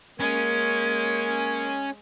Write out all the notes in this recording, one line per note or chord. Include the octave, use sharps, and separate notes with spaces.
G#3 A#3 C#4 G#6